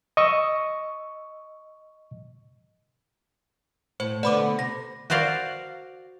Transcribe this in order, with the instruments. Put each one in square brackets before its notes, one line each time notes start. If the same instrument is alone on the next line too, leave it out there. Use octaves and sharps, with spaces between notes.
[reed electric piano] D#5 C#6 E6
[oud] A2 [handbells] C5
[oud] D3 A3 B3 [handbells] D5 B5 D6
[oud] C3 [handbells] A#6
[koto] F#4 A#4 C5 D5 F5